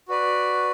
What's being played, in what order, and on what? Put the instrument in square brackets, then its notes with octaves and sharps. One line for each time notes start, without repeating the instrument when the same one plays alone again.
[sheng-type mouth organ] F#4 B4 D5